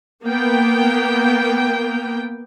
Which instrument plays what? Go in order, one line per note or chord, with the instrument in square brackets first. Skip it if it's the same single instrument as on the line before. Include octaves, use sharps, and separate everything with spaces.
[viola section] A#3 B3 G5